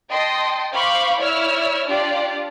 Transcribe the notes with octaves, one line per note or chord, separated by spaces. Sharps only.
D#5 G5 A5 C6
C5 F5 B5 C#6 D6
E4 C#5 D5 E6 F6
D4 F4 G4 D5